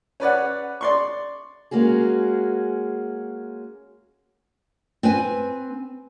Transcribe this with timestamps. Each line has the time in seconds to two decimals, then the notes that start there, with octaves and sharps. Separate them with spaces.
0.20 C#4 B4 D5 F#5
0.81 D5 C6 C#6
1.71 G#3 A#3 C#4 F#4 G#4
5.03 C4 B4 G#5